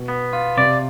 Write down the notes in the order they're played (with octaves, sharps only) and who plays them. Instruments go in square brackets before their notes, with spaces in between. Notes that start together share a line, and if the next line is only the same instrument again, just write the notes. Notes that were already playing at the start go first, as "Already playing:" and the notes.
Already playing: [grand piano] B2
[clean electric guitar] B3
F4
[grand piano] C3 [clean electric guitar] D5